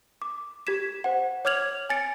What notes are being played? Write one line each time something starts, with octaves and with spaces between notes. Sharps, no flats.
D6
G4 G#6 B6 E7
C5 F#5
C#5 D6 F6 G#6 F7 F#7
G#5 A6 C#7 D7